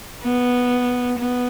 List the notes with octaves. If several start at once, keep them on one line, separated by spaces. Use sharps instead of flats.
B3
B3